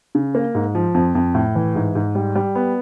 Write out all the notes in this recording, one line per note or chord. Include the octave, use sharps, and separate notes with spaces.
C#3
A#3
G#2
F3
F2
F2
A2
E3
G#2
G#2
G3
G3
B3